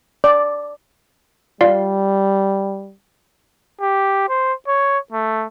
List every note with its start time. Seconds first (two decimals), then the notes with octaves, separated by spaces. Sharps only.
0.24 D5
1.61 G3 F4 D5 F5
3.81 G4
4.29 C5
4.68 C#5
5.12 A3